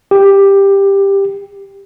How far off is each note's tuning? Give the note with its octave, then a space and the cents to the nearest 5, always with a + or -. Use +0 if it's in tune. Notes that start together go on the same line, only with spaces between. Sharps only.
G4 +10